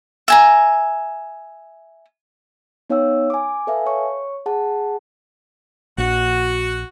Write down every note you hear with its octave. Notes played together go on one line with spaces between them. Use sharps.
E5 G#5 A#5
B3 D#4 C#5 F5 G5 E6
G#5 D6
A4 B4 E5 F5 G#5 A5
C#5 C#6
G#4 F#5 A5
A#1 F#4